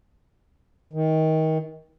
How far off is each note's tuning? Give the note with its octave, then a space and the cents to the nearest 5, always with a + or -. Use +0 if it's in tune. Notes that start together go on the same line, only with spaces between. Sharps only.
D#3 +25